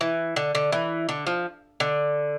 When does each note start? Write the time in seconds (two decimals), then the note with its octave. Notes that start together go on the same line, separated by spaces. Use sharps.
0.01 E3
0.36 D3
0.55 D3
0.72 E3
1.09 D3
1.27 F3
1.80 D3